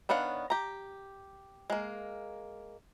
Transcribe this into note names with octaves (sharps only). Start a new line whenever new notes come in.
D#3 B3 D4 C#5 F5
G4 A#5
G#3 A#3